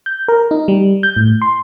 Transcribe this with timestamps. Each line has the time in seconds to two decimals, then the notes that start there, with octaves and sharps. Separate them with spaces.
0.06 G6
0.28 A#4
0.51 D#4
0.68 G3
1.03 G6
1.16 A2
1.42 C6